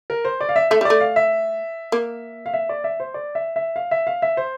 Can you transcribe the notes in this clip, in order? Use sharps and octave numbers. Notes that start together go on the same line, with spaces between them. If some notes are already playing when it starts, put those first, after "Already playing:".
A#4
C5
D5
F5
E5
A3 E5
G3
A3 D5
F5
E5
A#3
F5
E5
D5
E5
C5
D5
E5
E5
F5
E5
F5
E5
C5